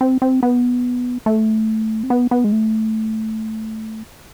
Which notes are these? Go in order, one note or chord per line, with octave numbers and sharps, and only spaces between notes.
C4
C4
B3
A3
C4
B3
B3
G#3
A3